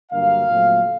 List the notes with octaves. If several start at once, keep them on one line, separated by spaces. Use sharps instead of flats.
G2 D3 F#3 A#3 F5
A#2 F#3 A3 C4